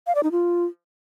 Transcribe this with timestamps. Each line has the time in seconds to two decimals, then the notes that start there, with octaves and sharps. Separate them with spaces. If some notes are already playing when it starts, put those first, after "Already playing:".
0.07 F5
0.15 D5
0.23 D#4
0.32 F4